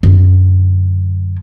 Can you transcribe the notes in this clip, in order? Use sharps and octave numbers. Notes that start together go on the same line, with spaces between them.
F#2 D3